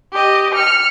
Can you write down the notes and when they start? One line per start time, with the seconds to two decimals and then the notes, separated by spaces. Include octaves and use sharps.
0.12 G4 D#5
0.54 F6 C#7